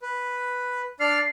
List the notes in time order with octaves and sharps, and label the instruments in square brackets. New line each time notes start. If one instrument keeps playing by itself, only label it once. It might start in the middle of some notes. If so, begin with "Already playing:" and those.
[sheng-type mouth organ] B4
[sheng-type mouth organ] D4 D5 F6 [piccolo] C7